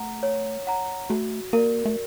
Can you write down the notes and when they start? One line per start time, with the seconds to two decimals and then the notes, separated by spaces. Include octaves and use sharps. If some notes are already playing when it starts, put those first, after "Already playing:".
Already playing: A3 F#5 A#5
0.23 C#5
0.67 F#5 A#5
1.10 A3 F#4
1.53 A#3 A#4 D5
1.85 A3